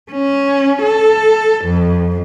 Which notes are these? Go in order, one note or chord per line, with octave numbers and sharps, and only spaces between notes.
C#4
A4
F2